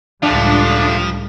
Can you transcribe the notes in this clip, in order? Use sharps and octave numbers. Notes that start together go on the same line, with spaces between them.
C#2 A2 F3 G3 A3 D4 F4